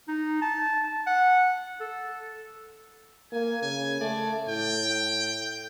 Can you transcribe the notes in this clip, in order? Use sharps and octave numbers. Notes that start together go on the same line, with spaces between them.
D#4
A5
F#5
A4
A#3 G#5
C#3 G#5
A3 D5
A2 G5